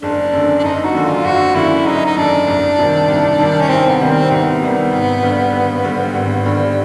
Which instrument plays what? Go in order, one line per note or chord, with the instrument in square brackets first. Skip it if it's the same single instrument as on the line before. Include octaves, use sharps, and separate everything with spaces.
[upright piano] F#1 [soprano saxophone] D4
[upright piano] F#2 D3
[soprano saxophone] D4
[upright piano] F#1 [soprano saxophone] D#4
[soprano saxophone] F#4
[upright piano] F#2 D3
[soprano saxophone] F4
[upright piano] F#1 [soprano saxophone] F#4
[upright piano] F#2 D3 [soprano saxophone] E4
[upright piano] F#1 [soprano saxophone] D#4
[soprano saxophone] D#4
[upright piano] F#2 D3 [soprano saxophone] D4
[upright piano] C2
C3 D#3 G3
C2
C3 D#3 G3
[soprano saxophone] C#4
[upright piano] C2 [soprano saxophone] C4
[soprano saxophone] B3
[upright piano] C3 D#3 G3
[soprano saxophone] C4
[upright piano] C2 [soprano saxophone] B3
[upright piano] C3 D#3 G3
G#1
G2 D3 G3
G#1
G2 D3 G3
G#1
G2 D3 G3